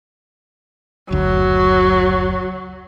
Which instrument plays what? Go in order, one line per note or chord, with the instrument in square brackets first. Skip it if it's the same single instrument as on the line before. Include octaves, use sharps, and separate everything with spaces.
[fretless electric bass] F#1 D2 [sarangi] F#3